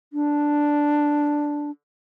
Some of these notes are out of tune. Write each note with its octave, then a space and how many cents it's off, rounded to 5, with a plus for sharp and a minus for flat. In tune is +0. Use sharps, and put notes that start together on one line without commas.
D4 +0